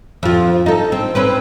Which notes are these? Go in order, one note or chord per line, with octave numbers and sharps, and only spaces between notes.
F2 F4
D#4 A4
C4
C4 C#4 B4